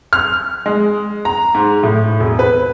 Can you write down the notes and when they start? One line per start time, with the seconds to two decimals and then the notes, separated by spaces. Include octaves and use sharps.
0.13 F6
0.66 G#3
1.25 A#5
1.55 G#2
1.83 A2
2.20 E1
2.39 B4